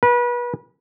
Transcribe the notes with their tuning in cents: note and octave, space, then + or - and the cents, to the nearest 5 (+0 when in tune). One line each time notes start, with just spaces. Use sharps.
B4 -30